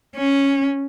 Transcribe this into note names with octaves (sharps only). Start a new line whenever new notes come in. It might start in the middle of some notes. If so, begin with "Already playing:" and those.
C#4